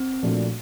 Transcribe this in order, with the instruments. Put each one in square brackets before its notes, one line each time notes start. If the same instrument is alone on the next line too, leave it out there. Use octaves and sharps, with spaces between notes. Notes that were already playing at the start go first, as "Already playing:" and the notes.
Already playing: [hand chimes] C4
[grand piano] A#2 F3 A3 D4 F#4